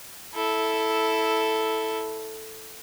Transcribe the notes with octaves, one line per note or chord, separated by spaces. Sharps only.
E4 A4